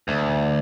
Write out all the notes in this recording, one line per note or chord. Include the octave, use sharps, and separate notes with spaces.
D2